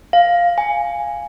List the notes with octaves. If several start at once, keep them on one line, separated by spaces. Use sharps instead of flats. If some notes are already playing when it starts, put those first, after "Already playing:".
F5
G#5